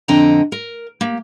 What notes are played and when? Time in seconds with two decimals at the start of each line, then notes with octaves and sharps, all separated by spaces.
0.08 F2 D3 C4 D#5 G5 A#5
0.52 A#4
1.01 A#3 G4